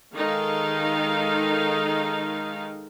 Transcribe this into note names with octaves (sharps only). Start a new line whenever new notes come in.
D#3 G#3 D#4 A4 F5